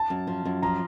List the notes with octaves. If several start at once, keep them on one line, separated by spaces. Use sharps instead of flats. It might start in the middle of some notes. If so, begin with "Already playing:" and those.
Already playing: A5
F#2
F3
F#2
F3 A#5